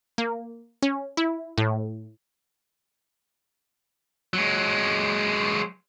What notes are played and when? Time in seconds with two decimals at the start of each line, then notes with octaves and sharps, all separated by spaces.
0.18 A#3
0.82 C#4
1.17 E4
1.58 A2
4.33 F#3 G#3